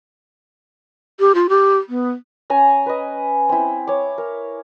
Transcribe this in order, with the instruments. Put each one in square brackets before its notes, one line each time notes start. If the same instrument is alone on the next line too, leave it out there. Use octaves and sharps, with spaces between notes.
[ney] G4
F4
G4
B3
[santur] C#4 G#5 A#5
B4 D#5
C4 E4
C#5 D6
A#4